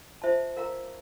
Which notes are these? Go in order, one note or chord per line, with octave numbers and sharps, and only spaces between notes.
F4 C5 E5 A5
A#4 F5 A#5